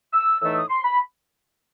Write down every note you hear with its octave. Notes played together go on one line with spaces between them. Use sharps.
E6
A2 E3 A3 D#4 E6
D#6
C6
B5